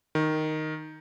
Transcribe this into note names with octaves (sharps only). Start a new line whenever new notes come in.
D#3